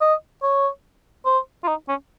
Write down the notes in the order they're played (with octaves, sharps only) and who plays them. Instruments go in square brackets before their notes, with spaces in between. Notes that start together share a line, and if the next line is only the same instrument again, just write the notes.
[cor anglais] D#5
C#5
C5
F4
D#4
C#4